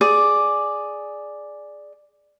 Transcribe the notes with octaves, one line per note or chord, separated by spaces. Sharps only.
G#4 D5